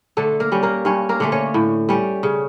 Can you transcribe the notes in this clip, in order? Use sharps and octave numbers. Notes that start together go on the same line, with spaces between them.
D3 A3 A4
A#3 A#4
G3 C#4
A#3 A#4
G2 C#4 C#5
A#3 A#4
D3 A3 C#4
C#4 C#5
A2
G3 C#4
C#3